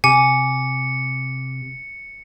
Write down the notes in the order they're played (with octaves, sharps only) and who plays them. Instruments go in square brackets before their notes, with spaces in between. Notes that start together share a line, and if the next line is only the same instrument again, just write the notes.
[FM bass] C3 [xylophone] G#5 [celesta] D6 [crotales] C#7